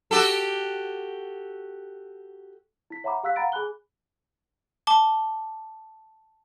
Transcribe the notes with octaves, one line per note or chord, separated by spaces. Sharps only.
F#4 G4 A4
E4 B6
C#5 E5 F#5 A#5 B5 D6
G4 F5 E6 F#6 B6
F5 F#5 A#5 B5 A6 D7
G#4 G#5 B5 F#6 G7
A5 D6 G7